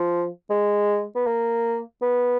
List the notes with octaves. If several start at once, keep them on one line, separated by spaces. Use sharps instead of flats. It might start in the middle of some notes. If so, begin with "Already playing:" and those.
Already playing: F3
G#3
B3
A#3
B3